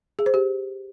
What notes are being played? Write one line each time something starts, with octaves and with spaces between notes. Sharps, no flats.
G#4
C5
G4